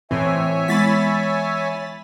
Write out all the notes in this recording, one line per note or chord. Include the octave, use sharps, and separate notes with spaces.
A2 E3 C4 C#5 E5 G#5
G#3 B3 E4 B5 A6 B6